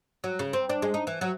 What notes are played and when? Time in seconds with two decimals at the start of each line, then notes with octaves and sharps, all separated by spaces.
0.24 F#3
0.39 C#3
0.53 C4
0.69 D4
0.82 G#3
0.94 D#4
1.07 E3
1.21 F#3